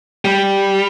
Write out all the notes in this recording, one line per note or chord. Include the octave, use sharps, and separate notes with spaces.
G3